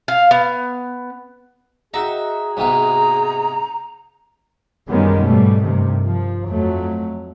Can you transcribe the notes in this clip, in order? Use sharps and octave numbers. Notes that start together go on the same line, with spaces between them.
F5
B3
D#4 F#4 G#4 E5 G5
G#2 C3 B3 A#5
F#2 D#3 G3 G#3 B3 C#4
G#2 B2 G3 A3
G2 C3 D#3
F3
F2 F#3 A3